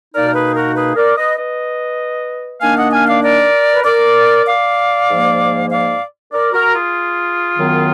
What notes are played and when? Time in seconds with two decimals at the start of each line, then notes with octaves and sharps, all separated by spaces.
0.13 B2 A#3 D#4 A#4 D5
0.27 A#4
0.34 G#4 B4
0.55 F#4 A#4
0.75 G#4 B4
0.96 A#4 D5
1.17 B4 D#5
1.37 B4 D#5
2.61 D#3 A#3 D4 F5 G#5
2.76 D#5 F#5
2.92 F5 G#5
3.07 D5 F5
3.23 A#4 D5
3.74 B4
3.84 A#4 D5
4.47 D5 F5
5.09 G#2 F3 A#3
5.70 D5 F5
6.33 A#4 D5
6.52 F#4 A#4
6.73 F4 G#4
7.56 F#2 D#3 F#3 B3